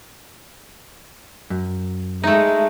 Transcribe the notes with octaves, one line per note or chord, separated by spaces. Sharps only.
F#2
G#3 A3 D#4 E5